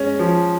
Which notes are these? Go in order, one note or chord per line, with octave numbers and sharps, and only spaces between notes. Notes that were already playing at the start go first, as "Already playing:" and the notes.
Already playing: G#3 C#4
F3